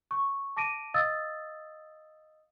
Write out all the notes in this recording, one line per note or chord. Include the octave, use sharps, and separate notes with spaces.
C#6
A5 D6 A#6 D7 D#7
D#5 F5 D#6 E6 A6